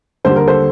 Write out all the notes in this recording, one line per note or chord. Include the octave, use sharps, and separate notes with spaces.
D#2 D3 G3 C5
A#4
A4 C5